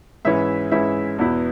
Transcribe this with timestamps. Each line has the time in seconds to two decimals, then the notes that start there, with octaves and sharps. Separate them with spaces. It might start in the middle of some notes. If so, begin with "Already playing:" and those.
0.25 G#2 E3 C#4 E4 E5
0.71 G#2 E3 C#4 E4 E5
1.18 E2 B2 B3 E4